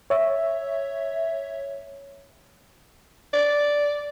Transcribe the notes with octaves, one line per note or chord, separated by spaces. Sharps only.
C#5 E5
D5